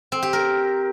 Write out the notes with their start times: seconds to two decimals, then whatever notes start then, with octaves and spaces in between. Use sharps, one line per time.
0.12 C4
0.23 G4
0.33 A#4